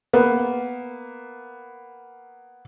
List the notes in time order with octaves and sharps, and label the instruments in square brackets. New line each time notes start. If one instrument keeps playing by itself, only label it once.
[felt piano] A#3 B3